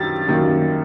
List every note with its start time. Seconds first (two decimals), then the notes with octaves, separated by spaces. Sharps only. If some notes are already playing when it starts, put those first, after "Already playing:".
Already playing: F#2 D#3 G3 A6
0.28 F#2 D#3 G3 A#3